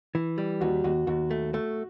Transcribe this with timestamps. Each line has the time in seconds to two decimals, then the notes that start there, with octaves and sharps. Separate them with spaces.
0.15 E3
0.38 G3
0.61 D#2 F#4
0.84 D#2 F#4
1.07 D#2 F#4
1.31 A3
1.54 A3